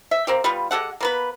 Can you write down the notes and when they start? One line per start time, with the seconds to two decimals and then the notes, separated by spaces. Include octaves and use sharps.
0.11 E5
0.27 A#3 C4 G4
0.44 G3 B3 F4
0.71 G#3 G4 A4 F#5
1.01 A#3 B3 B4